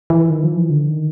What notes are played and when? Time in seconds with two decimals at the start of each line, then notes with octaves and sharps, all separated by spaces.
0.10 E3
0.30 D#3
0.43 F3
0.57 E3
0.70 D3
0.89 D#3